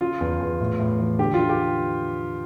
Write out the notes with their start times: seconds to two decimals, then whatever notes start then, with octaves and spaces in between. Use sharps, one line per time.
0.01 C#3 F4
0.21 E2
0.41 E2
0.60 A2
0.79 A2
0.99 E3
1.19 D3 G4
1.34 D3 F4
1.49 G4